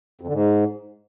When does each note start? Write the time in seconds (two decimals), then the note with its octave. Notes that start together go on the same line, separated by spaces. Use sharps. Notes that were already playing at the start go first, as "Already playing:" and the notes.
0.21 F2
0.27 D3
0.33 G#2